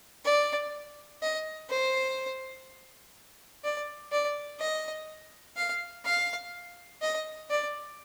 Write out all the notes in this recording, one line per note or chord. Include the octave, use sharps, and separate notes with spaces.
D5
D#5
C5
D5
D5
D#5
F5
F5
D#5
D5